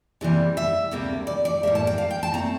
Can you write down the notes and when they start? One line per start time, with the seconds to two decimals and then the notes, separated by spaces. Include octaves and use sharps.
0.21 C3 E3 G3 A#3
0.57 E5
0.91 D2 C3 G3 A#3
1.27 D5
1.45 D5
1.63 A2 G3 A#3 E5
1.75 A5
1.87 G5
1.98 F5
2.11 G5
2.23 A5
2.34 A#2 A3 C4 A#5